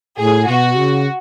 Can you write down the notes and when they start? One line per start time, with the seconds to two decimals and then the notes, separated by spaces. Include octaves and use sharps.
0.20 A2 G#4
0.48 B2 F#4
0.78 C#3